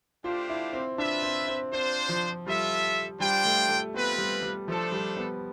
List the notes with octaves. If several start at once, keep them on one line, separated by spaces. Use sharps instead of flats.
A3 D4 F4 G4 C5 F5
E4
C4
D4 F4 B4 E5
C4
C4
C4 D4 F4 C5
F3
G3 F4 A4 E5
G3 D4 F4 C5 G5
A3
A3
B3 C4 F4 B4
G3
G3
F3 A3 D4 A4 C5
G3
B3